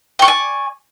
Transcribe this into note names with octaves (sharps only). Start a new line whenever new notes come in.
D5 G5 G#5 C#6